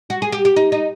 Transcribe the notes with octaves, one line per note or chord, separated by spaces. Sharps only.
F#4
G#4
G4
G4
D#4
D#4